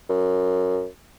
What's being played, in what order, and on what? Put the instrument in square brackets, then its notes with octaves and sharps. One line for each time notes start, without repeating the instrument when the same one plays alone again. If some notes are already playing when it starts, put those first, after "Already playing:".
[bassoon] F#2